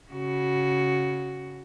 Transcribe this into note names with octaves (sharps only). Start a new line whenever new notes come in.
C#3 F#4